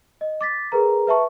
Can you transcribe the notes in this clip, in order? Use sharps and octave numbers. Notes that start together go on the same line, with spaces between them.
D#5
D6 A6 B6
G#4 A#4 B4 A#5
B4 E5 A5 C#6